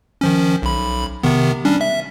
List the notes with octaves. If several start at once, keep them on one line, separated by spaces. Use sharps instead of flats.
D#3 F3 C#4
B1 B5
C3 D#3 B3
G3 C#4 D4
E5